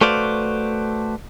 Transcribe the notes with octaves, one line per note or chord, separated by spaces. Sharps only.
A3 F#4 B4 C5 D5 F5